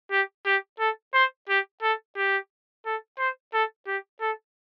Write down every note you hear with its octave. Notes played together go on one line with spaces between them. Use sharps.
G4
G4
A4
C5
G4
A4
G4
A4
C5
A4
G4
A4